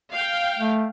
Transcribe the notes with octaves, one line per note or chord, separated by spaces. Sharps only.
F5 G5
A3